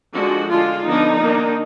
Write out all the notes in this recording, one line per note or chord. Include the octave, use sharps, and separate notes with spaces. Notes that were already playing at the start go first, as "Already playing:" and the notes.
D3 F3 G#3 D4 F#4
D3 G#3 D4 F4
D3 F3 B3 D4 D#4
D#3 A#3 D4